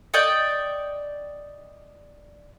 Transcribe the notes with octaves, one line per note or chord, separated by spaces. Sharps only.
D5 D#5 G5 C#6